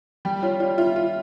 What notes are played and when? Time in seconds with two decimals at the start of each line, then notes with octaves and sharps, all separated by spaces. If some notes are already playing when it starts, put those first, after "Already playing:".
0.25 G3 G5
0.43 F4 C#5
0.60 F4 D5
0.78 F4 E5
0.96 F4